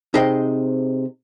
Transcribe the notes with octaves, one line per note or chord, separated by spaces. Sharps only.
C3 D#4 G#4 C5 D#5 G5